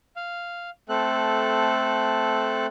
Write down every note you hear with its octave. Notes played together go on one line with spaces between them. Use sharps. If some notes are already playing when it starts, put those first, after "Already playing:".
F5
A3 C4 A4 F#6